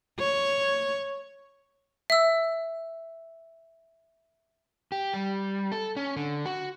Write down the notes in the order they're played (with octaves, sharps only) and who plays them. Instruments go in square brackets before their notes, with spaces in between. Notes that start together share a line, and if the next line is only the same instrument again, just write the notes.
[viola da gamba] C#5
[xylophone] E5 E6
[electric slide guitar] G4
G3
A4
C#4
D3
F#4